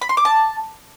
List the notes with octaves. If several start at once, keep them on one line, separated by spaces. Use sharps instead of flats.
B5
C6
D6
A5